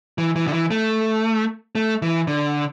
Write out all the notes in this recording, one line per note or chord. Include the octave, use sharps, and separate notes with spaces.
E3
E3
D3
E3
A3
A3
E3
D3